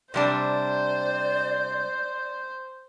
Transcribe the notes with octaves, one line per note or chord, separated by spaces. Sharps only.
C3 G3 D4 C5 D5